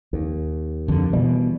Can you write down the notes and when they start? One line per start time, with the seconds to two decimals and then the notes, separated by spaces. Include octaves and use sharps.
0.13 D#2
0.88 F2 D3
1.13 B2 E3 G3